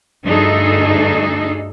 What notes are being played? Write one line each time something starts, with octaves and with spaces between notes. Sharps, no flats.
D2 G2 D4 D#4 G#4 A4